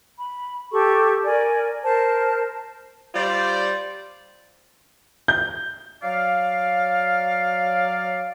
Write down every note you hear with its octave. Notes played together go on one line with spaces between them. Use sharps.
B5
G4 A4 C#6
A#4 D5 G#5
A#4 C5 A5
G3 F4 C5 D5
G6
F#3 D5 F5